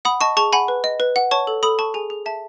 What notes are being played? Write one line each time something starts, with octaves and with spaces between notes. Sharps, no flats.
F#5 B5 D#6
D#5 A5 C#6
G#4 A5 C#6
F#5 G#5 B5
B4
D#5
B4
F#5
C#5 A5 C#6
A4
A4 B5 D#6
A4 A5 C#6
G#4 G#5
G#4
E5 A5